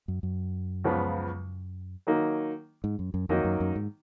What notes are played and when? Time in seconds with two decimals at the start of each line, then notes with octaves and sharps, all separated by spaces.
0.08 F#2
0.23 F#2
0.84 C#2 C#3 F3 B3
2.07 D#3 F#3 A#3 D#4
2.84 G#2
2.99 F#2
3.14 F#2
3.29 F2 D#3 F#3 A#3 D#4
3.45 F#2
3.60 F#2
3.76 G#2